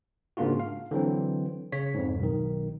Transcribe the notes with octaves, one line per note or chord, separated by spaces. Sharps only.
G#2 C#3 A#3 D4 F4 F#4
F5
D3 E3 F#3 C4
C#3 C#5 B6
F2 G#2
B1 D#3